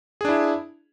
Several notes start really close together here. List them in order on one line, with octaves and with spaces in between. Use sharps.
G#4 D4 E4